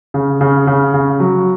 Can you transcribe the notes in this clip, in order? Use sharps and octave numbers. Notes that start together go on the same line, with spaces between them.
C#3
C#3
C#3
C#3
F#3